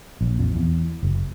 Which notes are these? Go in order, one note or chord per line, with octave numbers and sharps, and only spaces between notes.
A#1
F2
E2
F#1